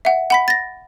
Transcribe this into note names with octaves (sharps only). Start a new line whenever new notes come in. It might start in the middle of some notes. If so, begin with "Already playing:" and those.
E5 F#5
F#5 B5 B6
A6 A#6